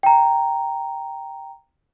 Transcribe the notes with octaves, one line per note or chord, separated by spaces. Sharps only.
G5 A#5